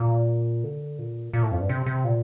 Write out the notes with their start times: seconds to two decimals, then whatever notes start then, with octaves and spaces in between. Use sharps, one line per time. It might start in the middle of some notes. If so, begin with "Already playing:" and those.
Already playing: A#2
0.64 D3
0.99 A#2
1.33 A#2
1.43 A2
1.52 F2
1.61 G2
1.69 C3
1.86 C3
2.04 A#2